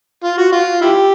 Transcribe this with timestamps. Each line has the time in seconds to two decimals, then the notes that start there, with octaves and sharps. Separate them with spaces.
0.24 F4
0.38 F#4
0.52 F4
0.81 E4 G4